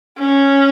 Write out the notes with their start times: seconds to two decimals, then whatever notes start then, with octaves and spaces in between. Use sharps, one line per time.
0.19 C#4